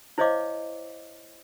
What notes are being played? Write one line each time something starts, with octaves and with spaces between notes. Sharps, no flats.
E4 C5 C#5 D#5 F5 D6